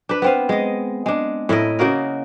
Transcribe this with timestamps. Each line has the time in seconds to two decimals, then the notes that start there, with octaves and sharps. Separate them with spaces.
0.09 D4 B4
0.22 B3 C4 F5
0.49 G#3 D#5
1.06 G#3 D4
1.49 A2 E4 A#4 D#5
1.79 C#3 A#3 F#4 A#4